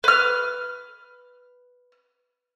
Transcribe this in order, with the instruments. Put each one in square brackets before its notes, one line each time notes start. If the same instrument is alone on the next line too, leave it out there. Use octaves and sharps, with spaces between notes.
[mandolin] B4 F6